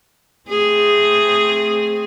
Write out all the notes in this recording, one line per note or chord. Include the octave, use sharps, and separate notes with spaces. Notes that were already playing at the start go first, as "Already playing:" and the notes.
A3 C4 G#4